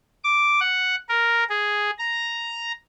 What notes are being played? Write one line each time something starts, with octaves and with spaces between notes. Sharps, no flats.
D6
F#5
A#4
G#4
A#5